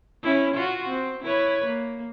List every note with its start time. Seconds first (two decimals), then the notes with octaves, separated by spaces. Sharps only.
0.23 C#4 E4
0.55 F4 F#4
0.88 C4
1.24 E4 B4 C#5
1.66 A#3